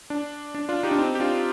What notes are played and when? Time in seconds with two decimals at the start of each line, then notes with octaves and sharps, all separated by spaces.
0.10 D4
0.55 D4
0.69 D4 F4
0.83 D#4 G4
0.91 D4
0.98 C4 D#4
1.15 G4
1.20 D4 F4